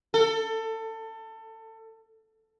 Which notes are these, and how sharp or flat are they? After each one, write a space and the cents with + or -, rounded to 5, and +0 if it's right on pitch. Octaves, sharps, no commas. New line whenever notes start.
A4 +25